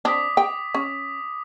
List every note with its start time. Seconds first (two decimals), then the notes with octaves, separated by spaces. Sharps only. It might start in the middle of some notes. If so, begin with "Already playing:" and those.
0.05 C4 D4 D6 D#6 B6
0.37 G5
0.74 C#4